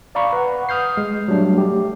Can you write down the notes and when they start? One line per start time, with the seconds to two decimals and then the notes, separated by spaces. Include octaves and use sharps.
0.15 D5 F5 A#5 B5 C#6
0.33 B4 F#5
0.69 D#6 F6 G6 C7
0.97 G#3
1.28 F#3 G3 A3 D4
1.57 A3 G4